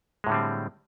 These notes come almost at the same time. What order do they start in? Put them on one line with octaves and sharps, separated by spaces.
G#3 A2 D3 G3 C4